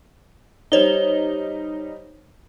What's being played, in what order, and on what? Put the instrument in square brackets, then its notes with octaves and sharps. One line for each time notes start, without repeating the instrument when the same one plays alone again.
[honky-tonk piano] G3 D#4 [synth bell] C5 C#5 G7